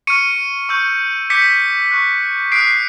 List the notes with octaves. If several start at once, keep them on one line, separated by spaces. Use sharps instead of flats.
C#6 F6 C#7 D#7
C#6 E6 G6
D6 G6 B6 C#7
C#6 F#6
D#6 F#6 C7 D7